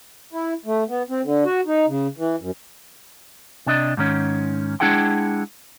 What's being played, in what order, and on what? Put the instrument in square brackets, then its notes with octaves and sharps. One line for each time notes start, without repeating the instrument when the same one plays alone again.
[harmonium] E4
A3
B3
C4
D3
F#4
D#4
C#3
E3
F#2
[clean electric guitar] C3 D4 D#5
G#2 D#3 C#4
G#3 D4 E4 G#4 F#5 G5